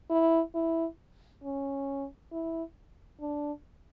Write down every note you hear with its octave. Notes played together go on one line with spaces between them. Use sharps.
E4
E4
C#4
E4
D4